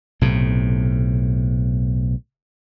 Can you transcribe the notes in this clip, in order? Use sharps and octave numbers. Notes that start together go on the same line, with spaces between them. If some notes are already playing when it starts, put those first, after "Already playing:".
B1 A2 C3